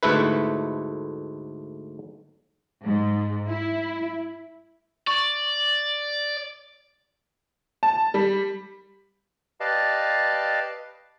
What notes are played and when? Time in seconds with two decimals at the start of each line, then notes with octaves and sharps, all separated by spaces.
0.03 D2 G#2 A3 E4 B4
2.85 G#2
3.49 E4
5.07 D5 C#6
7.83 A5
8.14 G3
9.60 G4 B4 D5 D#5 F5 A5